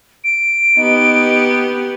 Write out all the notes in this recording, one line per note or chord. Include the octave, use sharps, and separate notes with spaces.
D7
B3 D#4 G4